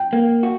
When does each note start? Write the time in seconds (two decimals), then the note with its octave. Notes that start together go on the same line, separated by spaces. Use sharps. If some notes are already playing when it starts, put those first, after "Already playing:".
Already playing: G5
0.13 A#3
0.43 F#4